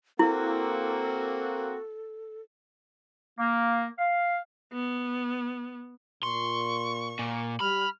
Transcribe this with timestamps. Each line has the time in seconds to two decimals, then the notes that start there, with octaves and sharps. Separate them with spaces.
0.19 A#3 C4 E4 F#4 A4
3.39 A#3
3.98 F5
4.73 B3
6.23 A#2 C6 C#6
7.19 A#2
7.60 G3 B5 F6